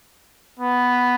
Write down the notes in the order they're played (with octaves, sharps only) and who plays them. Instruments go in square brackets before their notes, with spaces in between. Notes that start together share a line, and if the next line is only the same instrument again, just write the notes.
[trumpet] B3